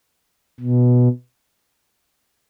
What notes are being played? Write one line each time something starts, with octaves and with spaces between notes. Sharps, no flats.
B2